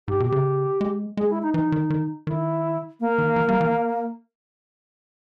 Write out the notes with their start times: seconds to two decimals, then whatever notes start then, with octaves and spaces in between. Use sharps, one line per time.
0.08 G#2 G4
0.20 B2
0.26 G4
0.32 C#3
0.81 G#3
1.17 G#3 G#4
1.29 E4
1.42 D#4
1.54 E3 D#4
1.72 D#3
1.90 D#3
2.27 D#3 E4
3.00 A#3
3.18 D#3
3.36 E3
3.49 G3
3.61 E3